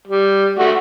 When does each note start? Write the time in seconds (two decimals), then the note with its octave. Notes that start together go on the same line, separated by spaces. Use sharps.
0.07 G3
0.59 A3 F#4